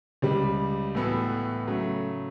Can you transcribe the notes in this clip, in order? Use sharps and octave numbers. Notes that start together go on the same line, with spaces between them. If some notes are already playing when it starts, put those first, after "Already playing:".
C#2 C#3 G3
A2 E3 B3 F#4 A4
C#3 F#3 A3